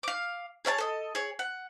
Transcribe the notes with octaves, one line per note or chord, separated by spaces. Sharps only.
F5 D6
G#4 C#5 E5 A5
A4 D#5
G#4 C#5
F#5